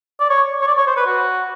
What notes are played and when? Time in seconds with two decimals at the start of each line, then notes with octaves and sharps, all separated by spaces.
0.20 D5
0.30 C#5
0.62 C#5
0.67 D5
0.78 C#5
0.87 C5
0.97 B4
1.06 F#4